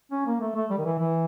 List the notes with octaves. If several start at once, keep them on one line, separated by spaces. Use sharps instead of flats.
C#4
A#3
A3
A3
G3
D#3
E3
E3